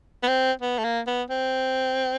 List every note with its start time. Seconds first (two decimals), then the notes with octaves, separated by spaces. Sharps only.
0.23 B3
0.28 C4
0.61 B3
0.78 A3
0.84 A#3
1.07 B3
1.30 C4